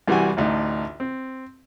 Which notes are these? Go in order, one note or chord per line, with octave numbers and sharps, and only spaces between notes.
C2 E3 G3 F#4 G#5
A1 D2 D#4
C4